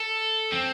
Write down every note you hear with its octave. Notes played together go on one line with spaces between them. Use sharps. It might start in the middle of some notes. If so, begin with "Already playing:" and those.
Already playing: A4
C4